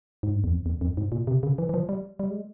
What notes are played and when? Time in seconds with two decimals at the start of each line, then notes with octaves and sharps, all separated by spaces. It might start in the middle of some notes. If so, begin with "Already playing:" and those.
0.23 G#2
0.35 G2
0.44 E2
0.51 F2
0.66 E2
0.81 F2
0.97 G#2
1.12 A#2
1.27 C3
1.43 C#3
1.58 E3
1.69 E3
1.74 F3
1.89 G3
2.19 G3
2.30 G#3